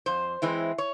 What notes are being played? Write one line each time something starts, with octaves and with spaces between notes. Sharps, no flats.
F2 C5
E3 G#3 C4 E4
C#5